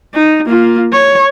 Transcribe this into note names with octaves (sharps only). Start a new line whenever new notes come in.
D#4
A#3 F4
C#5